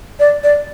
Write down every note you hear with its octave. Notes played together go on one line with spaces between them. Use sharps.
D5
D5